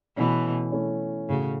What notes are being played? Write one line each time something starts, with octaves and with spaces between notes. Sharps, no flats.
B2 E3 A3 C#4 E4 A4 C#5
A3 C#4 E4 A4 C#5
A2 C#3 A3 F#4